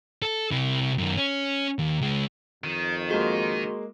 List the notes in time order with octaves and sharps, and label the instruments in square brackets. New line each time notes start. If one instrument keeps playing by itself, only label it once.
[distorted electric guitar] A4
C3 E4
F#2 D#3
C#4
D#2
C#2 G#3
[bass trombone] F2 [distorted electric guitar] D#3
[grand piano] G#3 A#3 [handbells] F#4 C6